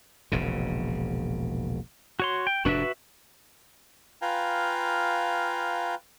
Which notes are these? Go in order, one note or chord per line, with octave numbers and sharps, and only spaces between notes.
E1 A#1 C#3
F#4 C#5 C6
G5
F1 G#2 D4 F#4 B4 E5
F4 B4 F5 G5 G#5 A#5